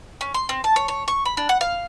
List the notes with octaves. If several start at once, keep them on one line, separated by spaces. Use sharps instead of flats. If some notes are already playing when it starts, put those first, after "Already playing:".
C#4
C6
C4
A5
C#5
C#5
C#6
B5
D4
F#5
F5